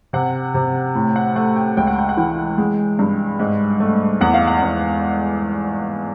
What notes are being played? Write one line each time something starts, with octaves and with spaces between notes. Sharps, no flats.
C3 F#5
C3
A2
F#5
A3 F#5
G5
C#2 G5
F#5
G5
F#5
E3 G5
G#3
G2
G#2
A3
E2 F#5
F5
F#5
E2